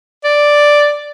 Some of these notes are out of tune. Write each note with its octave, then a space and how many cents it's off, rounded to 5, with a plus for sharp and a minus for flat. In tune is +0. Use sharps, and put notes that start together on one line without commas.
D5 +0